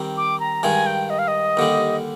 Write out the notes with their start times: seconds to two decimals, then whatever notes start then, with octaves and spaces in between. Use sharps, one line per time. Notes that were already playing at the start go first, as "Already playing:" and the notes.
Already playing: D#3 G3 C4 G4
0.17 D6
0.40 A#5
0.63 G2 D#3 G#3 G#5
0.86 G5
1.10 D#5
1.19 F5
1.28 D#5
1.57 D#2 D3 G3